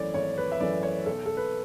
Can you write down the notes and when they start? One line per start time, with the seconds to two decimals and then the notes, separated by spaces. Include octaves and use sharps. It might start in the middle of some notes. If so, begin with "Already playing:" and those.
Already playing: G#1 F#2 E3 A3 C#5 D5
0.14 G#1 C#5
0.38 B4
0.52 E5
0.60 F#2 E3 A3 D5
0.83 C#5
1.06 B1 A4
1.26 A4
1.37 B4